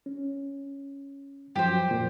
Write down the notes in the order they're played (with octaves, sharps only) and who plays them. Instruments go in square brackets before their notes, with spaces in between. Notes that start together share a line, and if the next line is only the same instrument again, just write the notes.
[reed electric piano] C#4
[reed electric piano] F#2 F3 F#3 [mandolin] G4 C5
[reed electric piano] F2 A#2